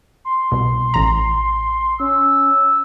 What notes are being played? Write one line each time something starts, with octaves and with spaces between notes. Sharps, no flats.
C6
C2 B2
A1 A#5
C#4 E6